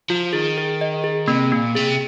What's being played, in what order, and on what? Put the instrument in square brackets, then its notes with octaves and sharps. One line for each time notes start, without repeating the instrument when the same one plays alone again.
[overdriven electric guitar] F3 [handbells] F4
[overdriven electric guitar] D#3 [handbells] G#4
[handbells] G#4
D#5
G#4
[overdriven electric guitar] C3 [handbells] A#3
[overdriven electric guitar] A#2 [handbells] A#3
[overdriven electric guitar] C3 [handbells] G#4